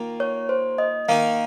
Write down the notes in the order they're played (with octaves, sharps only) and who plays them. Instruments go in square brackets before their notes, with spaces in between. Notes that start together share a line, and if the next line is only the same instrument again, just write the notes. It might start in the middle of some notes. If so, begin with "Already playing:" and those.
Already playing: [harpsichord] D#3 A#3 F4
[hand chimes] C#5
C5
D#5
[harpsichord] D#3 A#3 D#4 [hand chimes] F5